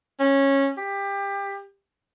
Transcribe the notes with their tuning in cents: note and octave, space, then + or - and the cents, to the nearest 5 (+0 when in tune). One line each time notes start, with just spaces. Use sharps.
C#4 -15
G4 +25